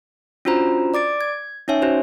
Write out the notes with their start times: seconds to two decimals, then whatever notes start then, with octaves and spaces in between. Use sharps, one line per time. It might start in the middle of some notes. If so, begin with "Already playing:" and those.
0.45 C#4 D4 F4 F#4 C5 A#5
0.94 D5 D6 A6 D7
1.21 G#6
1.68 C#4 D#4 C#5 E5 G#5
1.82 C#4 F#4 C5